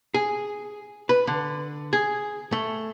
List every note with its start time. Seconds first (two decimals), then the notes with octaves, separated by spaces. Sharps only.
0.14 G#4
1.09 B4
1.27 D3
1.93 G#4
2.52 A3